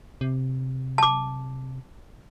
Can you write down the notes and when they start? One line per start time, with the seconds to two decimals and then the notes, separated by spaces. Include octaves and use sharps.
0.21 C3
0.98 A5 D6